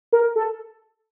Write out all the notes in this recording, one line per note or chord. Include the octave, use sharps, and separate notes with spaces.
A#4
A4